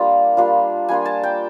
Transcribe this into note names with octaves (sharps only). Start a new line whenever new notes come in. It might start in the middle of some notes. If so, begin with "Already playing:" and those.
Already playing: G3 A#3 D4 F4
G3 A#3 D4 F4
G3 A#3 D4 F4 G#5
A5
G5